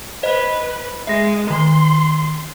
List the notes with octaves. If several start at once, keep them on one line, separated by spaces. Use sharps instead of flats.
B4 C5 D#5
G#3 E5 A#6
D#3 C6